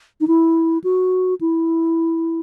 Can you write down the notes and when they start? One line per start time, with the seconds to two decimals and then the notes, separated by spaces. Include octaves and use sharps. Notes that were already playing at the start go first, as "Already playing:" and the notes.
0.21 D#4
0.28 E4
0.84 F#4
1.41 E4